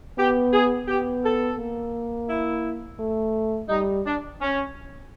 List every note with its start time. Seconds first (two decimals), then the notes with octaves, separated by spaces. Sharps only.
0.18 B3 G4
0.53 G#4
0.88 B3 G4
1.23 A4
1.59 A#3
2.29 E4
2.99 A3
3.69 G3 D#4
4.05 D4
4.40 C#4